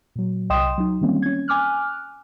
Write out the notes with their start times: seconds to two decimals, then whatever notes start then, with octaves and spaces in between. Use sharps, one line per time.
0.15 A#2 F#3
0.50 C2 D#5 G5 C6 D#6 E7
0.78 F#3 D#4
1.01 D#3 E3 G3 A#3 C4 C#4
1.22 C#4 G#6
1.48 G#5 D6 F6 F#6